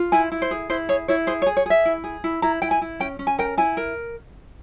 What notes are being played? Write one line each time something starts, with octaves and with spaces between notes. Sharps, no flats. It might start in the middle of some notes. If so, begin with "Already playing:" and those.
Already playing: F4
E4 G#5
E4
C5
G#4
E4 C5
G#4 C#5
E4 C#5
G#4 C5
C#5
G#4
C#5
G#4 E5
E4
G#4
E4
E4 A#5
E4 G5
G#5
E4
C#4 G5
C#4
G#5
A#4 G5
E4 G#5
A#4